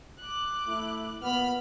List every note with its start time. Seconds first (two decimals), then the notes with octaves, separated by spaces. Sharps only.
0.20 D6 F#6
0.68 A3 E4
1.22 A#2 B3 B5 F6